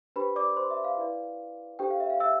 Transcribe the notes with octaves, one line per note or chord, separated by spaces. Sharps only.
D4 G4 B4 C5 B5
D5 D6
C5 C6
E5
F5
E4 B4 D5
D4 G4 A4 C5 G5
F5
E5
F5
E5 E6